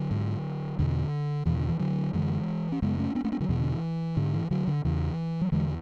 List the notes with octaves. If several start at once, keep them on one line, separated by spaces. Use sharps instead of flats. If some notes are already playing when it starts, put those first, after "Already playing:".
Already playing: D3 F#3
G#2
E2 B2 D3
E2 B2 E3
D3
E3
D3 F#3
F#2 D3 E3 G#3
C#4
F#2 C#3 G#3 B3
A3 C#4
B3 D4
A3 C#4
B3 D4
D3 F#3
E2 B2 E3
D3
E3
G#2 D3
E3
D3 F#3
D3
E2 C#3 E3
F#3
E2 D3 E3 G#3